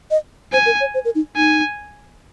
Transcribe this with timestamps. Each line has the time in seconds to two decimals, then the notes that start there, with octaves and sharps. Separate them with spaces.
0.11 D#5
0.53 C5 G#5
0.66 A#4
0.80 C#5
0.94 C5
1.05 A#4
1.15 D#4
1.36 D#4 G#5